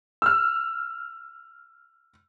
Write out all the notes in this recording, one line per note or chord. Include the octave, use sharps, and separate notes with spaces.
E6 F6